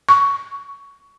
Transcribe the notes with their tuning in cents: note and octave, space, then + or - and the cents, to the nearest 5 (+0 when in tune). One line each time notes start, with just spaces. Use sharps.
C#6 +15